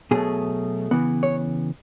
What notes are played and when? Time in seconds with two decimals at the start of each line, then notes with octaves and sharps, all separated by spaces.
0.11 B2 F#3 A3 G#4
0.91 C#3 E3 B3
1.23 C#5